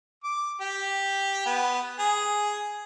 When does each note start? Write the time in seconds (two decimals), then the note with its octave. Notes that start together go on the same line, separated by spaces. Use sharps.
0.24 D6
0.61 G4
1.46 B3
1.99 G#4